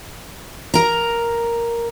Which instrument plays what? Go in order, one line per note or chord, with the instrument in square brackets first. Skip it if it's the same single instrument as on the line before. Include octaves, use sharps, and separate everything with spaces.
[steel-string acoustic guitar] A#4 A#5